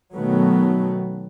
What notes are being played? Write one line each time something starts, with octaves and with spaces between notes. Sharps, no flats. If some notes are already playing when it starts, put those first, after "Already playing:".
B2 D#3 F#3 A3 B3